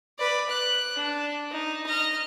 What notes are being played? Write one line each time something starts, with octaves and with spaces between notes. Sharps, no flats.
B4 D5
F#6
D4
D#4
D#5 F6